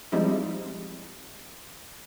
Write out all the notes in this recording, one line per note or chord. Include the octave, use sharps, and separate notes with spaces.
F3 G3 G#3 C4 D#4 E4